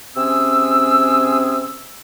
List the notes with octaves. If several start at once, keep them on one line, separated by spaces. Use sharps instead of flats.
C3 C4 C#4 G#4 E6